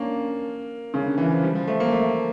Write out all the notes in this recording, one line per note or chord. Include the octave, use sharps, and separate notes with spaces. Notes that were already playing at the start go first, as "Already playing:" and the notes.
Already playing: A#3 C#4 D4
C#3
D3
E3
F3
G3
F3
A3
A#3
A3